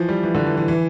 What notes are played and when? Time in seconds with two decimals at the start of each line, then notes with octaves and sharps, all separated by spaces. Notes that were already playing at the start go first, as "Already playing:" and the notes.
Already playing: E3 F3
0.09 G3
0.23 E3
0.35 D3
0.46 E3
0.57 E3
0.68 E3